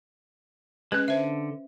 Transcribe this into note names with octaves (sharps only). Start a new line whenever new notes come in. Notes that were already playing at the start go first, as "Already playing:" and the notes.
G#3 C#4 B4 F#6
D3 C5 E5